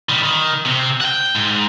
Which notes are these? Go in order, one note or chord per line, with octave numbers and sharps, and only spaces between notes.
D#3 G3
D#3
C3 C4
F#5 G5
G#2